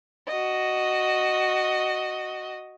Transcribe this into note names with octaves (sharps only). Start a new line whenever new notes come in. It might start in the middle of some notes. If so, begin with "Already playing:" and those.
F#4 D#5